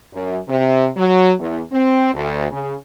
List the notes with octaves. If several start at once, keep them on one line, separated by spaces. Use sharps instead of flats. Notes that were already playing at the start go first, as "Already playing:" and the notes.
F#2
C3
F#3
E2
C4
D2
C#3